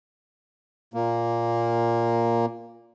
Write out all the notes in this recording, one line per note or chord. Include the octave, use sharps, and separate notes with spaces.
A#2 A#3